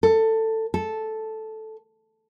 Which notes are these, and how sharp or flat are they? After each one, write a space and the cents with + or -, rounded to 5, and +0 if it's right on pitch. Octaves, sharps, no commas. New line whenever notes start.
A4 +15
A4 -5